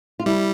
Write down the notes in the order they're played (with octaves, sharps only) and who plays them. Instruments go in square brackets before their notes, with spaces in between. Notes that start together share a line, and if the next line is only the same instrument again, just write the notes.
[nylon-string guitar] F4
[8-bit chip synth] G3 [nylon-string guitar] E4